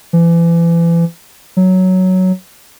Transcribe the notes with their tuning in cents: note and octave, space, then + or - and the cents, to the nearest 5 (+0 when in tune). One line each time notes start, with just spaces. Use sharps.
E3 +35
F#3 +5